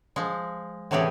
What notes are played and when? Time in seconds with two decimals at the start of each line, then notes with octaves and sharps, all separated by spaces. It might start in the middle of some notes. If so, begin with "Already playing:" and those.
0.16 F3 G#3
0.91 A2 C3 E3 C#4 G4 G#4